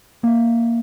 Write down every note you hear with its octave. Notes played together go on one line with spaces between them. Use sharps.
A#3 E5